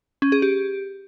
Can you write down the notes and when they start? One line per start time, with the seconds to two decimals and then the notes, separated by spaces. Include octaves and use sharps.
0.22 C#4
0.32 G#4
0.42 G4